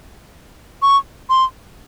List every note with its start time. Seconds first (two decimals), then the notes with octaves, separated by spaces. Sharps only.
0.82 C#6
1.30 C6